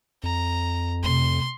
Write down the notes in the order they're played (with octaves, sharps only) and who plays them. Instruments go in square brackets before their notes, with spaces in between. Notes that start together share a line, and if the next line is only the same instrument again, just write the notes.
[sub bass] F2 [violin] A#5
[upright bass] C3 A3 [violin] C6